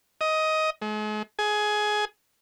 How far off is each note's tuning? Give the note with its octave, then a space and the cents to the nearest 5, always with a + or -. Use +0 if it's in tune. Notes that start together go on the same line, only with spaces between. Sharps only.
D#5 +15
G#3 +40
G#4 +15